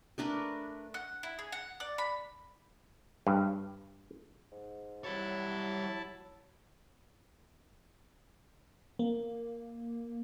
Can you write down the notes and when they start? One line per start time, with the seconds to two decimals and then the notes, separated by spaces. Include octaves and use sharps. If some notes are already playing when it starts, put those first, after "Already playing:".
0.18 A3 D4 A#4 B4
0.94 F#5
1.23 E4
1.39 G#4
1.52 F#5
1.80 D5
1.98 B5
3.27 G2
4.51 G#2
5.04 F#3 G3 E4 C#5 A5
8.99 A#3